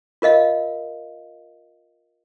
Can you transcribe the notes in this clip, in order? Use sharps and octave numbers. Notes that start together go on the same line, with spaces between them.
F4 A#4 D#5 F5